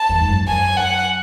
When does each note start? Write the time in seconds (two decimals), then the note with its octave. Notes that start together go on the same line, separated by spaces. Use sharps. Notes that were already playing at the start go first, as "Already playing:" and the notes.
Already playing: A5
0.09 E2
0.20 G#2
0.28 F#2
0.48 F#2 G#5
0.77 F#5